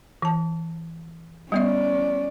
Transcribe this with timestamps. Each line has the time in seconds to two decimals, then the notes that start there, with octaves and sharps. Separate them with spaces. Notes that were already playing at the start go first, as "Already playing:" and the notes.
0.22 E3 A5
1.52 G3 B3 C#4 D5 E5